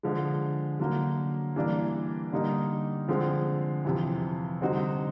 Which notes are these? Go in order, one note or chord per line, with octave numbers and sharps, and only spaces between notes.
D3 F3 G#3
D3 F#3 A#3
E3 G3 A#3 D4
D3 G3 A#3 D#4
D3 F3 G#3 C4
F2 C3 E3
D3 G3 C4 D#4 F#4